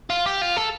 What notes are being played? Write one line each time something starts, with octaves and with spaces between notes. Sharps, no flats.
F4
G4
F4
A4